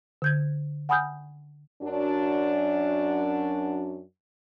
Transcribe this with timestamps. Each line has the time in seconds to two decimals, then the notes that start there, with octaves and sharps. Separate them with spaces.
0.22 D3 G6 G#6
0.89 F#5 G#5 B5 D#6 F6 G6
1.82 F#2 D4 F#4